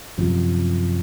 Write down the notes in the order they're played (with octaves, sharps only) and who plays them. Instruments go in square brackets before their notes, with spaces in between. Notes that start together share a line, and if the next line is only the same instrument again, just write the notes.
[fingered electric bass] F#2 C3 F3